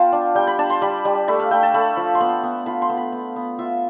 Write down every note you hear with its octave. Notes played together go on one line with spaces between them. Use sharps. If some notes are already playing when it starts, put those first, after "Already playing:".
Already playing: B3 F4 F5 G5 A5 B5
D4
G3 G5
B5
D4 A5
C6
G3 B5
G3
A3 B5
F5
A3 G5
A5
A3 B5
F3
C6
B3 B5
B3
F4 B5
C6
B3
B5
B3
B3
F4 E5